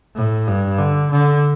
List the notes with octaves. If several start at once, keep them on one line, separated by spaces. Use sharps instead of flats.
A2
G2
D3
D3